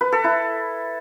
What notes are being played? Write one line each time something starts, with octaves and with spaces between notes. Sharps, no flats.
B4
A4
E4